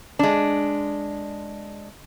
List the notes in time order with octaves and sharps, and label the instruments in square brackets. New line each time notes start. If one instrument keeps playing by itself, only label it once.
[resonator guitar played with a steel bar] G#3 D4